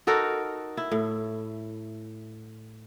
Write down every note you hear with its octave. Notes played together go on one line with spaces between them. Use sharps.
D#4 F#4 A4 A#4
E4
A2